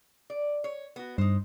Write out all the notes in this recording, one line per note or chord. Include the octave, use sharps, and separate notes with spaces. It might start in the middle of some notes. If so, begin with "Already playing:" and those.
D5
C#5
B3 F#4
G2 D#4 C5